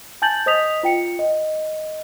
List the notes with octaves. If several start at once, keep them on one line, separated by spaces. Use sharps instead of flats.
G#5 A5 G6 A6 F#7
C5 D#5 D#6 B6 F7
F4 G5 C#7
D#5